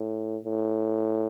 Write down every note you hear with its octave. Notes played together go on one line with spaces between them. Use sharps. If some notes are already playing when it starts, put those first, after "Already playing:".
Already playing: A2
A2